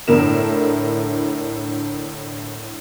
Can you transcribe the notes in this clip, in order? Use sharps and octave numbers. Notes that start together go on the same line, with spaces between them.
A2 D3 E4 A#4 E7